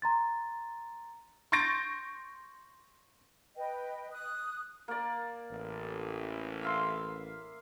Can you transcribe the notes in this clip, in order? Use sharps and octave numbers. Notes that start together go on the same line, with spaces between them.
A#5 C6 A6
C6 C#6 G6 A6 A#6 D7
B4 D#5 G5
D#6 F#6
A#3 D5
A1
E5 F5 C6